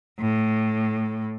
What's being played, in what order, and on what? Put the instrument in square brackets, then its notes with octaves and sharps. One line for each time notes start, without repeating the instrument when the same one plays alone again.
[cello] A2